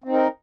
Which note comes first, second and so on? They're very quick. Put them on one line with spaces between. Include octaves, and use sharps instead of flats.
C4 D#4 A#4